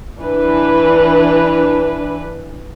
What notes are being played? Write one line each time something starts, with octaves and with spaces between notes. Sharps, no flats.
E3 D4 B4